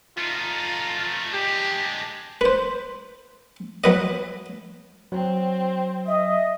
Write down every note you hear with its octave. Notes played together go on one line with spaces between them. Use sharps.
A3 D#4 F4
G#3 D4 G4
B4 C5
F#3 B4 D#5
F#3 C4
D#5 E5